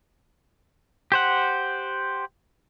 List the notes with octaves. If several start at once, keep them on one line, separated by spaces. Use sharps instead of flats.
G4 C5 F#5